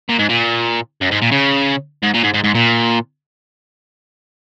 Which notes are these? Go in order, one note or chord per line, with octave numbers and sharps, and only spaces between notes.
A#2
G#2
A#2
F#2
G#2
A#2
C#3
G#2
A#2
G#2
G#2
G#2
A#2